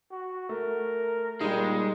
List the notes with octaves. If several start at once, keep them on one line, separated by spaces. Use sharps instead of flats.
F#4
A3 A#4
A#2 G3 G#3 D#4